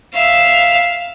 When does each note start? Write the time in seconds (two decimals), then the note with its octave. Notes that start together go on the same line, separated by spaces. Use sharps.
0.14 E5 F5